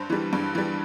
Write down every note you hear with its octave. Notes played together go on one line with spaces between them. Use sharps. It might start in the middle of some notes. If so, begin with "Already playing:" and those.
Already playing: G2 C5
E3 G3
G2
E3 G3